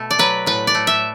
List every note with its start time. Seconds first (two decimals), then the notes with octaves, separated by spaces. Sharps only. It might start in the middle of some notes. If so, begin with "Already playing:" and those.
Already playing: B2 A3
0.11 D5
0.19 F#3 B4
0.46 A2 B4
0.67 D5
0.75 A3
0.87 E5